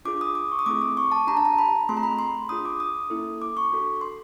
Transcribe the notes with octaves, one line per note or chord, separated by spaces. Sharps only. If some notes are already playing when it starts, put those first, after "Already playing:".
D4 F4 G#4 D6
D#6
D6
C#6
D#6
A3 C4 E4 G#4 D6
D6
C#6
A5
D4 G4 A#5
A5
A#5
B5
A3 C4 F4 G#4 C6
A#5
B5
C6
D4 F4 G#4 D#6
D6
D#6
A#3 C#4 E4 A4
D6
C#6
D4 F#4 A4
C6